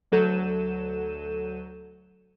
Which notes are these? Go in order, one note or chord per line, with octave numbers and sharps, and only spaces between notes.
D2 F#3 A4 G6 D#7 E7